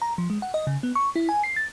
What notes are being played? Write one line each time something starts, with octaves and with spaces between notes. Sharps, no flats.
A#5
F3
G#3
F#5
D#5
C#3
B3
C#6
E4
G#5
C7
A6